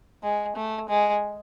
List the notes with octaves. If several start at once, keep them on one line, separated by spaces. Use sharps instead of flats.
G#3
A3
G#3